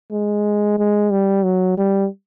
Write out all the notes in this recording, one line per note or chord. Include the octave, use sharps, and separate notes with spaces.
G#3
G#3
G3
F#3
G3